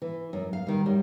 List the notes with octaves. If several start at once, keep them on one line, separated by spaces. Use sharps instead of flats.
E3
F#2
F5
D#3 G3
F#2 G3